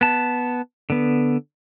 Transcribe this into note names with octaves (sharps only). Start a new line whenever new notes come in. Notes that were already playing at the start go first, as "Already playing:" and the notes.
B3 A5
D3 B3